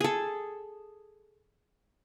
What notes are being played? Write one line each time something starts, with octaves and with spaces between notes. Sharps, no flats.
G#4 A4